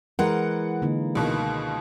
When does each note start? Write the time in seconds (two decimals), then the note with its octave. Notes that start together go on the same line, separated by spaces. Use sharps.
0.19 E3 G#3 A#4 F#5
0.82 D3 A#3 D#4
1.15 C#2 B2 D#3